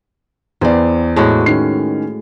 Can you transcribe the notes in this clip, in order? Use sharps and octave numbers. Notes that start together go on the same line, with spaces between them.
E2 B3 C4 D5
A2 G#3 F#4
D#3 C#4 C7